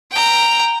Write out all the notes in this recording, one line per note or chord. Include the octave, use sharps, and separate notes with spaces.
G5 A#5